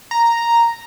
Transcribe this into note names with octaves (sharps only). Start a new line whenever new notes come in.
A#5